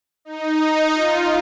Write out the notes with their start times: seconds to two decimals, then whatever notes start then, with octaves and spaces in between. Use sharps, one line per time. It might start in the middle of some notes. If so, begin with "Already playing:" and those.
0.25 D#4
0.93 F4